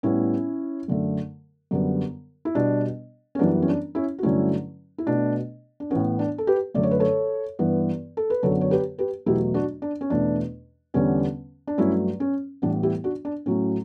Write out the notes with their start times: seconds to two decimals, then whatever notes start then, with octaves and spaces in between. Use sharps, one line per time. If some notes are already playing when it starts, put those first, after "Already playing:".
0.03 A2 G3 B3 C#4 E4
0.88 F#2 D3 A3
1.71 F#2 D3 G3 B3
2.45 E4
2.55 B2 G3 B3 D4
3.35 C#4
3.39 F#2 E3 G3 B3 D4
3.62 C#4
3.68 D4
3.95 C#4 E4
4.19 F#4
4.23 G2 D3 F#3 A3 C#4 E4
4.98 E4
5.07 B2 A3 D4
5.80 D4
5.91 A2 E3 B3 C#4
6.19 D4
6.38 A4
6.47 G4 B4
6.74 F#2 D3 A3 D5
6.83 C#5
6.91 B4
7.00 A4 C#5
7.59 G2 E3 B3
8.17 A4
8.30 B4
8.43 F#2 D3 F#3 B3 A4 C#5
8.61 C#5
8.71 G4 B4
8.98 G4 B4
9.26 E2 B2 F#3 A3 E4 G4
9.54 D4 F#4
9.82 D4
10.01 C#4
10.10 E2 B2 A3 D4
10.94 E2 D3 G3 B3 C#4
11.67 D4
11.78 G2 F#3 A3 C#4 E4
12.20 C#4
12.62 A2 E3 G3 B3 D4
12.83 E4 G4
13.04 D4 F#4
13.25 D4
13.46 A2 F#3 A3 C#4